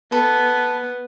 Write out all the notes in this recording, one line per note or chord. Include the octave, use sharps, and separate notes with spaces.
B3 A4 B4